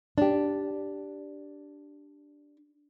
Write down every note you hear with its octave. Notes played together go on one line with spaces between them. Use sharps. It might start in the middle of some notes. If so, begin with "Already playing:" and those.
D4 G4